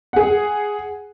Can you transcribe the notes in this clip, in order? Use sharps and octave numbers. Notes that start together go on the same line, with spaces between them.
G#4 F#5